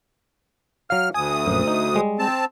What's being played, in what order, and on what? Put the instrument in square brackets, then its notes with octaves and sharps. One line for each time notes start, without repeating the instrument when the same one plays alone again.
[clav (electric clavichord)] F#3 F5 [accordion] F6
[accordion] D2 D#6 [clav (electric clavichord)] G#5
[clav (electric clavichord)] A#1 F#2
D#4
G3 G#3
[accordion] C4 A5